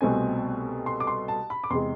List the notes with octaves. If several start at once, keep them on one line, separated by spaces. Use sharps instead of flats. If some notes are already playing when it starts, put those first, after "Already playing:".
C2 B2 A3 C4 G#5
C6
D6
C6
A5
B5
D6
E2 C3 G#3 C6